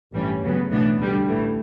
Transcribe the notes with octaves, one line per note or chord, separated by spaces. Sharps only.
A1 G2 E3 G3 C#4
D2 C#3 F#3 B3
B1 A2 E3 B3 D4
D2 D3 G3
A1 A2 E3 A3